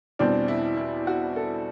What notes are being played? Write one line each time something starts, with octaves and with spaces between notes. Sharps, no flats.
E2 B2 G3 C4 D4
E4
E4
F#4
A4